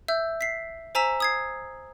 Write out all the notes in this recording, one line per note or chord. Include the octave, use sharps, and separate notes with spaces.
E5 E6 G6
B6 C7
C5 G#5 A#5 E6 B6 E7
D#6 G#6 C7